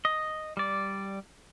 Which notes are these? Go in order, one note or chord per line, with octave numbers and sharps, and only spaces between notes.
D#5
G3 D5